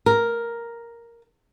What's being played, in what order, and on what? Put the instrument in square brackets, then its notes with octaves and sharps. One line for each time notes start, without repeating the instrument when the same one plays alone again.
[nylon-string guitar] A#4